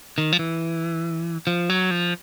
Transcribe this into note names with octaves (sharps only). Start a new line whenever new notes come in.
D#3
F3
E3
F3
F#3
F3